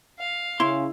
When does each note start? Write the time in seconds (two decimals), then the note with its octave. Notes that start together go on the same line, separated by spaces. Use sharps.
0.19 F5
0.60 C#3 E4 C6